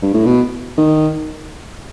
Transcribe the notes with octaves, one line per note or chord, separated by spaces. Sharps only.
G2
A2
B2
D#3